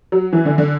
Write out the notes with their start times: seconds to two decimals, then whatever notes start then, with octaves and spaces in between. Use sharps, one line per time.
0.12 F#3
0.33 E3
0.45 D3
0.58 D3